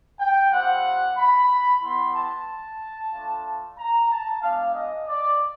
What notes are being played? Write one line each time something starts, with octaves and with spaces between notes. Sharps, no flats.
G5
G3 C4 F4 F#5
B5
G3 B3 E4 C6
A5
A3 D4 F4
A#5
A5
G#3 B3 D4 F5
D#5
D5